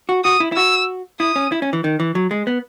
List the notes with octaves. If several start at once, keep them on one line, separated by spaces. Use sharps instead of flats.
F#4
F#4 D#6
E4
E4
F#4 E6
E4 D#6
C#4
E4
C#4
E3
D#3
E3
F#3
G#3
B3